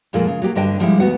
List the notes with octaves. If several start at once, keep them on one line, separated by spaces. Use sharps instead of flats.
F2 A#2 F3 G#3 A4 A#4
C#3
F#3 A#3 G4
G2 D3 D4 D#5 G5 A5
D3 F3 G3 G#3 E4
D2 B3 F#4 F#5